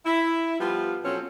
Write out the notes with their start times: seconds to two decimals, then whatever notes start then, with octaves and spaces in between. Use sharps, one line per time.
0.06 E4
0.60 F3 G3 B3 F4
1.04 B2 F3 F#3 C4 C#4 A4